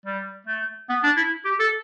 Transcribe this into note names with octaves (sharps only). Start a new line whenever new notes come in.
G3
A3
B3
D4
E4
G4
A4